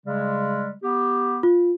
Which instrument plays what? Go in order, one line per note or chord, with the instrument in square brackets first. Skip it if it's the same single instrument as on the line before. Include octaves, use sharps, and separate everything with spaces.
[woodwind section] C#3 G3 G#3
B3 G4
[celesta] F4